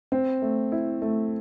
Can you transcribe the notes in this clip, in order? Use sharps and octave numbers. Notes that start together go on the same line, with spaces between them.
C4
A3
E4
A3